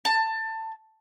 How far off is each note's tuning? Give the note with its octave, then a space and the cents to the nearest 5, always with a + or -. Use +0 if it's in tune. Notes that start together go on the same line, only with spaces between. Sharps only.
A5 +20